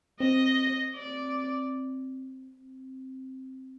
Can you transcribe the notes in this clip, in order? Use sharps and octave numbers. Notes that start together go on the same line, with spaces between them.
C4 D#5
D5